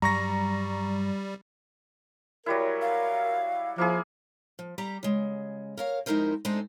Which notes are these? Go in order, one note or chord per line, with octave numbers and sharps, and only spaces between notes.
G2 F#3 G3 A#5 C#6 A#6
F#3 G3 E4 A#4
F5
F3 A#3 E4 G#4
F3
G3 G4 A#5
C#3 G#3
A#4 C#5 F5
F2 G#3 D#4 E4 A#4 C5
G#3 A3 C4 D4 D#4 A4